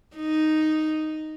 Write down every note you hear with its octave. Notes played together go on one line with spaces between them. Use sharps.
D#4